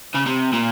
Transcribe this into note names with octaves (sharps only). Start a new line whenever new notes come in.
C#3
C3
A#2